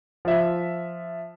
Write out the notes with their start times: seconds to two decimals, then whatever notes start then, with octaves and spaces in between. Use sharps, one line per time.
0.25 F3 E5